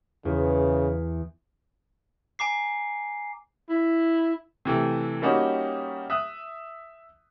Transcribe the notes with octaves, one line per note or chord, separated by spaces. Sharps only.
E2 C#3
G#5 A#5 D6 C7
E4
C3 E3 A3
G3 A#3 C#4 D#4 F#4 G4
E5 D#6 F#6